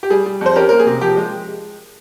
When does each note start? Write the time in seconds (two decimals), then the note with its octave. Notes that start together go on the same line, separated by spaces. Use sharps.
0.03 G4
0.10 G3 G#4
0.26 G3
0.41 F2 C5
0.56 C#4 G4 A#4
0.69 A#3 A#4
0.80 G#4
0.87 C3
1.01 F3 G4
1.17 G#3